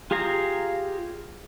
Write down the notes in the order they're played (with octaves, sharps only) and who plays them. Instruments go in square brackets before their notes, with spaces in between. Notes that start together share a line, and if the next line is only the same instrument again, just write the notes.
[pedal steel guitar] F4 G4 G#4 F5 A#5